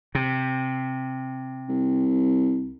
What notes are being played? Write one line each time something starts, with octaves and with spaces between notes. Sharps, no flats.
C3
C2